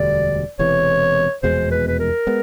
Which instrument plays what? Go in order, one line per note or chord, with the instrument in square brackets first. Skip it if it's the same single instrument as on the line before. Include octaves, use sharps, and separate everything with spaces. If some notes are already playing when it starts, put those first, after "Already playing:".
Already playing: [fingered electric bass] E1 D2 D3 G3 [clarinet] D5
[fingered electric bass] E1 E2 C3 E3 [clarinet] C#5
[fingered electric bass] F1 E2 B2 G#3 [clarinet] C5
[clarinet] B4
B4
A#4
[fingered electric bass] G#3 B3